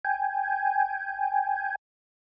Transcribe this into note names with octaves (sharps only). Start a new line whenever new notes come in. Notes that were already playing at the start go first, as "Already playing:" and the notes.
G5 G#5